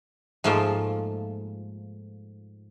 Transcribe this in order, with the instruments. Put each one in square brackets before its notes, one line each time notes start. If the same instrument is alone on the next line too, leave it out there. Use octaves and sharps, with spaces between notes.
[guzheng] G#2 F3 A3 A#3 F4